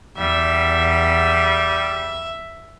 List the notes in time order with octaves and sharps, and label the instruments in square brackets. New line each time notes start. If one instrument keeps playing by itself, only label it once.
[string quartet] E2 [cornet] G3 [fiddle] E5